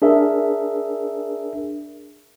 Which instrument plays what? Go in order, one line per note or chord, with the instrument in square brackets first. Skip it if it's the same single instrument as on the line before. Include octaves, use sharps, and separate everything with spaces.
[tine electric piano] D4 G#4 A#4 E5